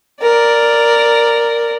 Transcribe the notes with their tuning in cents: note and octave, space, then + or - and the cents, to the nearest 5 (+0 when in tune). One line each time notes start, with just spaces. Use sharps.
A#4 +0 D5 +0